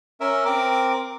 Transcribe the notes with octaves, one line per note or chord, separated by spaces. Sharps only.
C#4 A#4 E5
C4 A#4 D6